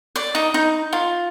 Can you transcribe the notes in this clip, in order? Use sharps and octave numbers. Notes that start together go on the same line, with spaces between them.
D5
D#4
D#4
F4